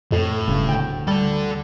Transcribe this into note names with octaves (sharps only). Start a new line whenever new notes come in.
F2 A2
E1 C#2 G2 C#3
D2 G5
G3 A4 D5